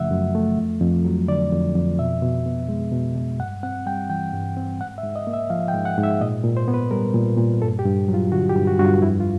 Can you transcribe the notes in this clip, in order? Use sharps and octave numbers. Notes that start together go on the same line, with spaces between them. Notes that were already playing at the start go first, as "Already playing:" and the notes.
Already playing: F#2 C#3 F3 A3 E5 F#5
F#2
A3
F2
F2
F#3
D3 D5
F2
F2
B2 E5
B2
B3
G#3
B2
B2
G2 F#5
C4 F#5
G3 G5
E3 G5
G2
C4
G#2 F#5
E5
G#2
D#5
A#3
E5
F3 F5
G5
G#2
F#5
G#2
E5
A#2 D#5
A#2
C5
B3
B4
G3 A#4
A#2
A#2
G2 A4
G4
G2
F#3
F4
D3 F#4
G4
G2
F#4
G2 F#4
F4
F2 E4
F4